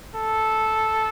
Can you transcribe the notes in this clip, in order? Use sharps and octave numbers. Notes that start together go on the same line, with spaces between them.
A4